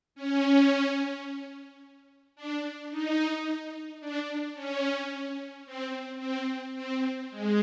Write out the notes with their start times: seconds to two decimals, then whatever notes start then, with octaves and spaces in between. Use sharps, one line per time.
0.15 C#4
2.36 D4
2.91 D#4
4.01 D4
4.55 C#4
5.66 C4
6.20 C4
6.76 C4
7.30 G#3